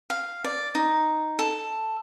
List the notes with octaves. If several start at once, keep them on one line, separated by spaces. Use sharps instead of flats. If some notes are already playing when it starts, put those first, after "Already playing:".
F5
D5
D#4
A4